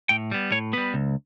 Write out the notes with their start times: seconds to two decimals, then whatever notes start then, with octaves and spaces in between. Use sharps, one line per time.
0.09 A2 G5
0.31 G3 B3
0.52 A2 C#5
0.73 G3 B3 B4
0.94 C#2